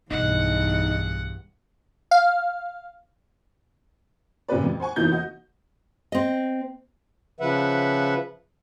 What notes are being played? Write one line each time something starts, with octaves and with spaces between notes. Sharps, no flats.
B1 E2 G2 G3 D#4 F#5
F5
G#1 A#2 C#3 G4 B4 D5
F2
C5 F#5 G#5 C#6
F1 E2 E3 A#3 D#4 G6
F#4 D#5
C4 D#5
C#3 F3 B4 E5 F#5